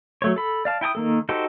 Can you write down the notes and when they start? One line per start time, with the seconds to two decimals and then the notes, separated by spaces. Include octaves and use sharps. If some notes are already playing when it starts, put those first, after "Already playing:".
0.22 F#3 A3 C#5
0.36 A4 B5
0.65 D5 F5 A5
0.81 E4 G5 A5 D#6
0.95 D#3 A#3 A4
1.29 D#4 F#4 G4 A4 C5